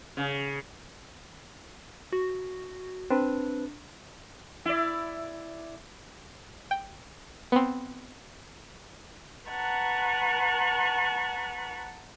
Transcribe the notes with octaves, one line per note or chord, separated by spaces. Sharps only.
C#3
F#4
C4 D4 B4
E4 D5
G5
B3 C4
B4 F#5 A5 A#5 C#6 F#6